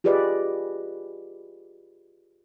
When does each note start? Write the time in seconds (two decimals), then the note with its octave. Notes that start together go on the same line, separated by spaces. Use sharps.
0.04 F4 G4 G#4 B4 D5 D#5